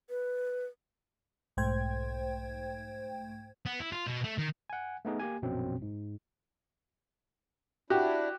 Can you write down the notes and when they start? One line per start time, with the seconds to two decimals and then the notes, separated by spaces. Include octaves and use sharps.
0.10 B4
1.57 B1 G#2 A3 C5 G5 G#6
3.66 B3
3.80 E4
3.92 F4
4.07 B2
4.24 A3
4.38 D#3
4.70 F#5 G#5
5.05 A3 B3 D#4 G#4
5.19 A#3 G4 G#5
5.42 A#1 F#2 B2 F#3 C4
5.82 G#2
7.90 D4 E4 F#4 G4